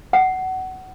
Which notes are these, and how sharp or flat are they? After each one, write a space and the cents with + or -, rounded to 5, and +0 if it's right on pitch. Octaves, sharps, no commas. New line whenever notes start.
F#5 +20